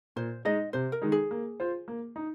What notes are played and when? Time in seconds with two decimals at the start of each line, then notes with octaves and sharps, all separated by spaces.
0.16 A#2 C5
0.45 G#3 D#4 D#5
0.73 C3 C5
0.92 A#4
1.02 D#3 G#3 D#4
1.12 G#4
1.31 A#3
1.60 F4 C5
1.88 A#3
2.16 D#4